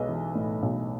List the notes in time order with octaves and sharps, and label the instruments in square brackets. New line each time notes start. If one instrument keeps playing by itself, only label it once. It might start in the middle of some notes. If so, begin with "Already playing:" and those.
Already playing: [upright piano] B1 G#3 B4 D#5
E3
A2
B1